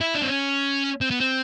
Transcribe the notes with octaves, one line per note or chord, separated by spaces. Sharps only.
E4
D4
C4
C#4
C4
B3
C4